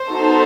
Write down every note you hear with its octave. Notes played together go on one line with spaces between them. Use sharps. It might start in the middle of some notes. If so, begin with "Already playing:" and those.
Already playing: C5
B3 D#4 F#4 A4